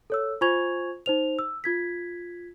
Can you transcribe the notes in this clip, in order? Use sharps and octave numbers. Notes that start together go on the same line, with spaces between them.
A4 C#5 E6
F4 C5 G#5 C#6 G#6 F7
D#4 C5 F7
E6
F4 G#6 B6